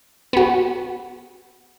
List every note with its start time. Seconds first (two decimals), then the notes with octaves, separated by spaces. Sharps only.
0.33 B3 F#4